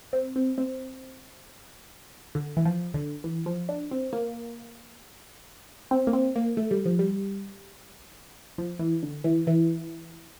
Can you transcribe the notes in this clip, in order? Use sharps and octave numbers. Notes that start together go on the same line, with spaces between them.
C4
C4
C4
D3
E3
F3
D3
E3
F3
D4
C4
A#3
C4
A#3
C4
A#3
A3
G3
F3
G3
F3
E3
D3
E3
E3